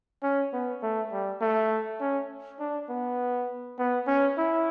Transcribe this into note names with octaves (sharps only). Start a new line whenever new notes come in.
C#4
B3
A3
G3
A3
C#4
D4
B3
B3
C#4
E4